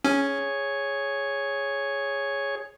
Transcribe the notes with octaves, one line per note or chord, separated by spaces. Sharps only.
C#4 G#4 C#5